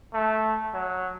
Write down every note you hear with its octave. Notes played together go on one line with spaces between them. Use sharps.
A3
F#3